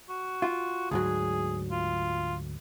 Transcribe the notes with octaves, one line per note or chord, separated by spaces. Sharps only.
F#4
F4
D2 G#2 F#3 G#4
F4